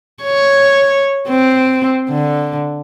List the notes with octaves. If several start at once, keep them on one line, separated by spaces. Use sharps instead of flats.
C#5
C4
D3